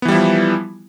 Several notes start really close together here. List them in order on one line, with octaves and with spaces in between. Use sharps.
B3 E3 G3 E4 F3